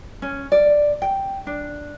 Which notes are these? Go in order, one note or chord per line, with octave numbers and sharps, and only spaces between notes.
C#4
D5
G5
D4